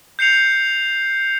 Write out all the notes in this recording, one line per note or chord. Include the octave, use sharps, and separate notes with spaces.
G6 C7 C#7 F7